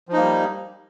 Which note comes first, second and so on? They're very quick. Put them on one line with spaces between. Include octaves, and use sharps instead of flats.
F3 D#4 A#3 G3